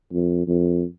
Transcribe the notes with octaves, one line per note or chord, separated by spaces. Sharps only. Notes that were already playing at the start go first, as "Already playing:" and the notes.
F2
F2